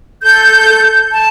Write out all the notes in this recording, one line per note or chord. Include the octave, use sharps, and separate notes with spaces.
A4 G6
A5